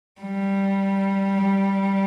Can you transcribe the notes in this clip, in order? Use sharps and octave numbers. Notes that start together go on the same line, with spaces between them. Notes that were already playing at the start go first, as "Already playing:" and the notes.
G3